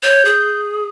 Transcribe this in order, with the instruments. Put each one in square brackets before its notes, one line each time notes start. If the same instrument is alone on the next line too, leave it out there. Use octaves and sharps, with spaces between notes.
[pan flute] C#5 [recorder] G6
[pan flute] G#4